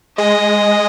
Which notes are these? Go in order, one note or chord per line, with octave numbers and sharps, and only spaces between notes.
G#3 D#5